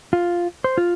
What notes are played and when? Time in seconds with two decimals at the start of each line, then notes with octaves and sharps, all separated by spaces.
0.13 F4
0.64 C5
0.78 F4